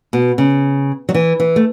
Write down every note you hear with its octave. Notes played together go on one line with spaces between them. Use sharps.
B2
C#3
F#3
E3
E3
A3